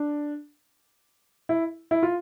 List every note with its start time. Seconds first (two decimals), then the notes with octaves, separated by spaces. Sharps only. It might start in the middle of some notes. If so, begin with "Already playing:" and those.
Already playing: D4
1.49 E4
1.91 E4
2.03 F4